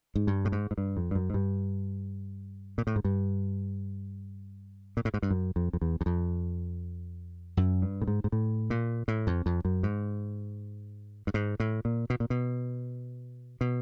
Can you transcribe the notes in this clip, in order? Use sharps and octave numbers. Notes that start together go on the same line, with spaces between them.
G#2
G2
A2
G#2
G#2
G2
F2
G2
F#2
G#2
G2
A#2
A2
G#2
G2
A#2
A2
G#2
G2
F#2
F2
F2
E2
E2
F2
F#2
G2
A2
G#2
G#2
A2
A#2
A2
F2
F2
F#2
G#2
G2
G#2
A2
A#2
B2
A#2
B2
B2